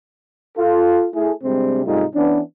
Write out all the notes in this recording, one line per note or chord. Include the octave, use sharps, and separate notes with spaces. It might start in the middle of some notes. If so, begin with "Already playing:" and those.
F4 A4
A3 E4 G#4
C3 G3 G#3 C4 D4
G#2 C3 G3 A3 D#4 F4
E3 B3 C#4 D4